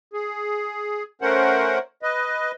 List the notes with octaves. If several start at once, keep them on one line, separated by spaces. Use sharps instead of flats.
G#4
A3 C#4 A#4 C5 F#5
B4 D#5